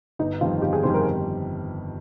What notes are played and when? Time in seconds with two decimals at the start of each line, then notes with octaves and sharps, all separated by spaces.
0.19 G1 D#4
0.41 F2 D#3 G3 F4
0.62 G1 G4
0.73 G#4
0.83 F2 D#3 G3 C5
0.94 A#4